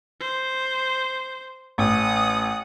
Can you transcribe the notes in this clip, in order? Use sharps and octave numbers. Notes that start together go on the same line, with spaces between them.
C5
A1 F#5 D#6